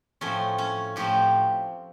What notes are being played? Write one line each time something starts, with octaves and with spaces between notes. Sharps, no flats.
A2 F3 A3 C4 C#4
C#4
A2 F3 A3 C4 G4